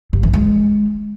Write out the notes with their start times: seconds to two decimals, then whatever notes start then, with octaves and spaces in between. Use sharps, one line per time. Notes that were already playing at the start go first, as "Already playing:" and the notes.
0.13 G2
0.23 E3
0.33 G#3